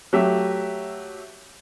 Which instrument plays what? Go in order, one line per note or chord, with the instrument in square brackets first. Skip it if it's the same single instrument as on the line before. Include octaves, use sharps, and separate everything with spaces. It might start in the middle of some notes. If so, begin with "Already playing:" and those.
[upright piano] F#3 A3 G4 E5